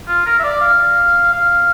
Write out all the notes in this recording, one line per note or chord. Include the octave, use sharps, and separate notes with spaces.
F4
A#4
E5
D5
F5
F5